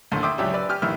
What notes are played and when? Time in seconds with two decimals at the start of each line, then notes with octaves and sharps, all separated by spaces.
0.12 A1 D#2 D3 A4 C6
0.23 E5 G5 C6 D6 D#6
0.38 C#2 F#3 D4 G4 E5
0.53 B4 D5 E6
0.69 G4 G#5 F6
0.82 A1 D#3 E3 E5 F6